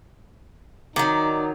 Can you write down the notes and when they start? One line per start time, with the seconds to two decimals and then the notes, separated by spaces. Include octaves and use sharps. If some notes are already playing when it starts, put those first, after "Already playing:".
0.96 D#3 F#3 D#4 D5